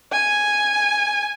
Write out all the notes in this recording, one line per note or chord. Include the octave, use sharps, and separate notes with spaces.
G#5